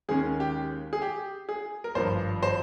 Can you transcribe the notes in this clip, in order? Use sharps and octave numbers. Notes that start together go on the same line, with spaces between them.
D#2 D#3 G#3 C#4 G#4
G4
G#4
G4
G#4
A#4
G#1 G2 F3 C5
C5